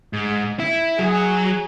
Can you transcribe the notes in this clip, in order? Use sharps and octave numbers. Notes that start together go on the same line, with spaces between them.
G#2
E4
F#3 G#4